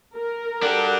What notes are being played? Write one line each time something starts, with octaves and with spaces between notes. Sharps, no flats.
A#4
D4 F#4 G4 A4 F#5